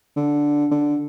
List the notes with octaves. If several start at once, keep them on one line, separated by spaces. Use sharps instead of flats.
D3
D3